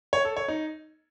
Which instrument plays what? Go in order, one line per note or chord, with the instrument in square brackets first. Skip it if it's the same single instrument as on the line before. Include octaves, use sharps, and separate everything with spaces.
[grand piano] C#5
A4
C#5
D#4